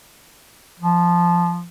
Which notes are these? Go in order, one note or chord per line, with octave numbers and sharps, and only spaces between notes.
F3